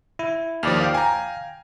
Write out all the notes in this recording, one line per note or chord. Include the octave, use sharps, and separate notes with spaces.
E4
D#2 F3 D5 F6
F5 G5
G#5 A#5